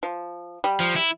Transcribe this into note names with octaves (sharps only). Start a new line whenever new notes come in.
F3
G3
F3
E4